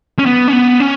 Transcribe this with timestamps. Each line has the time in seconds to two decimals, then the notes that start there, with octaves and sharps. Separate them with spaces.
0.19 C#4
0.26 B3
0.48 C#4
0.53 B3
0.80 C#4